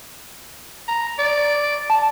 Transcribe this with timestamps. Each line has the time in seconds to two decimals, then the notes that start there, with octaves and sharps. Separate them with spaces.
0.88 A#5
1.19 D5
1.90 A5